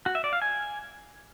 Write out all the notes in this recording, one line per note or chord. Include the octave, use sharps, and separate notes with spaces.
F#4
E5
D5
F5
G#5